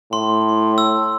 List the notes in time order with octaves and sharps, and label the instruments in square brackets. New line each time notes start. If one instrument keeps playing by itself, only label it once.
[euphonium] A2 [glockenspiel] C6
[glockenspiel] E6